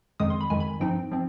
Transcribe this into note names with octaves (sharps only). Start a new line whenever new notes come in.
F2 D#3 G#3 D#6
C6
B5
F2 D#3 G#3 G#5
B5
G2 F3 C4 D#4 G5
F3 C4